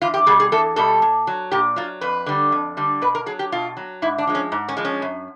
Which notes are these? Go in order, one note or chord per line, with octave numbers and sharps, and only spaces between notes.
E2 F4
G4
B2 G3 G#4
G#4
E2 A4
B2 G3 A4
A#2
F#3
A#2 G4
F#3 F4
F2 B4
D3 G3
F2
D3 G3
B2 B4
A#4
F#3 G#4
G4
B2 F4
F#3
G#2 E4
D4
F3 G#3
C#4
G#2
C#4
F3 G#3
C#4
F#2